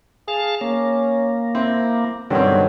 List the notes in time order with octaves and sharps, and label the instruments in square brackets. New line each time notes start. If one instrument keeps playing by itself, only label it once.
[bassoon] G#4 [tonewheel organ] F5 A5
[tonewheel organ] A#3 [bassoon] C#4
[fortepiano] C4 [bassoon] E4
[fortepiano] G2 B2 C4 [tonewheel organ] D3 D#3 D4 [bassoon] F#3